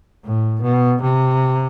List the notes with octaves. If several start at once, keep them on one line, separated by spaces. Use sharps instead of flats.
A2
B2
C3